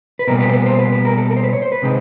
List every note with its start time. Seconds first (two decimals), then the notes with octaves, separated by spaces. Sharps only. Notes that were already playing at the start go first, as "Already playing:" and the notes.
0.19 B4
0.27 B2 G3 A#3 A#4
0.40 B4
0.49 C5
0.53 B4
0.66 C5
0.79 B4
0.92 B4
1.05 A#4
1.17 A4
1.31 A#4
1.37 C5
1.43 B4
1.49 C5
1.53 C#5
1.62 C5
1.72 B4
1.82 C3 D#3 G#3 C4